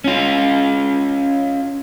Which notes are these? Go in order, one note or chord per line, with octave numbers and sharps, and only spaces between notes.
C#4 F4